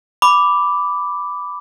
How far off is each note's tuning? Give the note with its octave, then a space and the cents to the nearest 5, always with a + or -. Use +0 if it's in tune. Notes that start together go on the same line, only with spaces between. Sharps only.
B5 +5 D6 +0